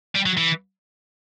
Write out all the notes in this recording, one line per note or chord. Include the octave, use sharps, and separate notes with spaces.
G3
F#3
E3